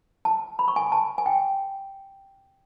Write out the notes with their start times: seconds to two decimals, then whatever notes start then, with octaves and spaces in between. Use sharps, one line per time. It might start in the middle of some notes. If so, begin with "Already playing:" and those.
0.25 A5
0.59 B5
0.68 C#6
0.76 G#5
0.92 A5
1.18 G#5
1.26 G5